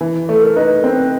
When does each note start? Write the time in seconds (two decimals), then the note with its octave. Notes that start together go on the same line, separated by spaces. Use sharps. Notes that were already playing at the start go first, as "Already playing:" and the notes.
0.01 E3
0.29 A3 A4
0.43 A#4
0.56 D#4 B4
0.84 C4